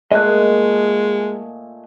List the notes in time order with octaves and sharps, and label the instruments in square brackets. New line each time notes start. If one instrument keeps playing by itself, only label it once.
[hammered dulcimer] A#2 A3 G#4 [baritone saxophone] G#3 [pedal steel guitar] D#5 F#6